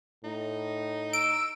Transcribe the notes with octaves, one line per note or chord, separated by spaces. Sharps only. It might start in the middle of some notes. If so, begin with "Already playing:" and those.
A2 D#4
E6 D7